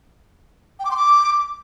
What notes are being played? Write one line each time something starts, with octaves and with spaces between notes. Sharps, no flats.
G5
D6
C6
D6